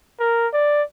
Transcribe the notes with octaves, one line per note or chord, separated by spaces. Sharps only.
A#4
D5